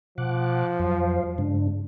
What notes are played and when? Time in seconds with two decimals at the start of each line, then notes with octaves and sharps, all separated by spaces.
0.18 B2 F3 F#5 D6 F#6
0.80 F2 F#3 C5 F5
1.38 G2 C#3 G#3 D4